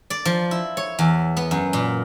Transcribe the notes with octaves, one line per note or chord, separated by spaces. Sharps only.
D5
F3
E4
C#5
E2
B3
F#2
A#2